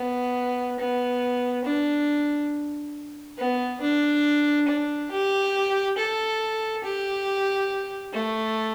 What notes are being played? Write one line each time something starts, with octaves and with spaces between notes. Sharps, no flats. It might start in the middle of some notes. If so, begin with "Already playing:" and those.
Already playing: B3
B3
D4
B3
D4
D4
G4
A4
G4
A3